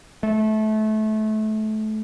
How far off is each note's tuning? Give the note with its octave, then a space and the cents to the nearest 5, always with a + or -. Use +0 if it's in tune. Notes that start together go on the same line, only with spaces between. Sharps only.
A3 -25